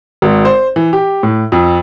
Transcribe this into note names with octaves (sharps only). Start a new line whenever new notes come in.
G#1
C5
E3
G4
A2
F2